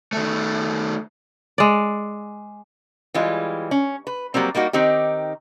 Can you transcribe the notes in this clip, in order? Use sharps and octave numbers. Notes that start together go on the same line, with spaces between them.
D#3 A3
G#3 D5
E3 G3 G#3 F4
C#4
B4
F#3 G3 A#3 C4
G3 A#3 D#4 F#4
D#3 C4 D#4 G4